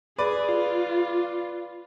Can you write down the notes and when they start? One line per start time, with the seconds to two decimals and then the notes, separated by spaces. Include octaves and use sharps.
0.18 G#4 B4 D5
0.49 F4